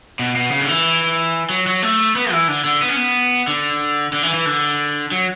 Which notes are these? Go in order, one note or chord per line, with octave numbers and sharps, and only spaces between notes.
B2
B2
C#3
D3
E3
F#3
F#3
A3
B3
E3
D3
D3
B3
C#4
B3
D3
D3
E3
E3
D3
F#3